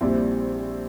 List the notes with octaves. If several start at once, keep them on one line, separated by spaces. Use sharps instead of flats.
A#1 A#2 G3 C4 E4